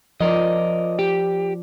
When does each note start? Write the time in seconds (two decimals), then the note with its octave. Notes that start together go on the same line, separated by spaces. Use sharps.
0.21 F3 A#4 D5 D#5
0.99 G4